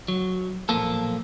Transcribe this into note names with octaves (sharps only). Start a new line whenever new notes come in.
F#3
B1 A#2 F3 A#3 A4